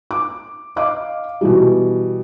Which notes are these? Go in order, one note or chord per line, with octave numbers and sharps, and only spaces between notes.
D6
D#5 F5 D6
B2 E3 G3